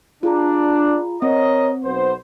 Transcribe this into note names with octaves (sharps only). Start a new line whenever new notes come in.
D4 F4 G#4 A#5
C4 A#4 C#5 D#5
B1 B3 C5